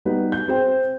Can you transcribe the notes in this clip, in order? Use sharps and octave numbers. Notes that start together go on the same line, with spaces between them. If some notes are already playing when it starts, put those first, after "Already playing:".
G3 B3 D#4 B4
G6
C4 G#4 C5 G5